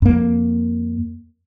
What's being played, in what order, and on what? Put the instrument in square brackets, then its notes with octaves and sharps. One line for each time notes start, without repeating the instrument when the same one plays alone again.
[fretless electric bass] F2 A#3